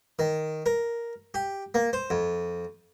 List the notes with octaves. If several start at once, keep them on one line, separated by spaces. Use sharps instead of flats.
D#3
A#4
G4
A#3
C5
F2